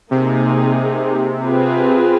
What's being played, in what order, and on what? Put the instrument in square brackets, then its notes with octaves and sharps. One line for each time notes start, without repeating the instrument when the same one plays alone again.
[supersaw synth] C3 [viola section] A#3 D#4 G#4
[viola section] C4 F4 G#4 B4